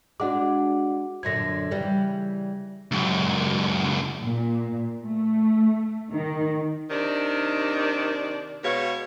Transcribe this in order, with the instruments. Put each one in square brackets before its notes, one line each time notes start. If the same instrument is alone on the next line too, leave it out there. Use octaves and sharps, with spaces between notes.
[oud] G#3 D4 [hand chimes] F#4 F#5 D6
[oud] F#2 A#2 D3 [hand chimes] G#6 A#6
[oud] C#3 E3 G3
[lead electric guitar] C#2 F#2
[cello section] A#2
A3
D#3
[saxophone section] C3 D#3 D4 D5
B2 G#3 C#5 F5